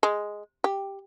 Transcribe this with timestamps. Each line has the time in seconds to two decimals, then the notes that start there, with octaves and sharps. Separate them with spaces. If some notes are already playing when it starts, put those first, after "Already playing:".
0.03 G#3
0.64 G4